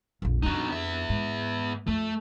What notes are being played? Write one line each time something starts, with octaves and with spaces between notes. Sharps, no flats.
A#1 F2
F2 D4 D#4 F#4
B3 E5
G#2
F2 A3